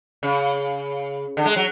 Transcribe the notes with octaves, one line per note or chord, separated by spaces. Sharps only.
C#3
D3
G#3
F#3